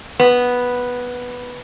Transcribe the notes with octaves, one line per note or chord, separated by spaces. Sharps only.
B3